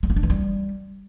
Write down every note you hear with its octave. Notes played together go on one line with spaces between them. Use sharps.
G#3
A#3
D4
E3
G3